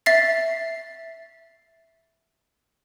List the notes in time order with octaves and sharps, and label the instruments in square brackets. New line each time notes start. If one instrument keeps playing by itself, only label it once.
[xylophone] E5 A6 C7